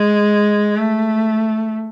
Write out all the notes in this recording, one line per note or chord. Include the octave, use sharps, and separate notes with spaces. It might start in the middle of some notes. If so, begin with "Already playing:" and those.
Already playing: G#3
A3